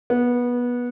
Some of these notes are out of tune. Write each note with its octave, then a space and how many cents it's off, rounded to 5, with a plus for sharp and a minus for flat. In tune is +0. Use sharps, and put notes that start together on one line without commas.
B3 -20